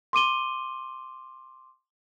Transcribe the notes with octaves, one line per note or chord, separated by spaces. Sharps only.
C6 D6 D#7 G7